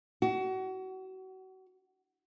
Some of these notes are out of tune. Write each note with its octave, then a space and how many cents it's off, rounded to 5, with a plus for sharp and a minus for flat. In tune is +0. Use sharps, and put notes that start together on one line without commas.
F#4 +30